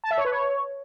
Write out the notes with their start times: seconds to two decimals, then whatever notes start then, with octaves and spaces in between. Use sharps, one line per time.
0.04 A5
0.11 E5
0.18 C#5
0.25 B4
0.32 C#5